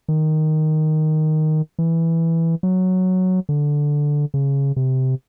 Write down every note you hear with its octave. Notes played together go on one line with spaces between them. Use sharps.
D#3
E3
F#3
D3
C#3
C3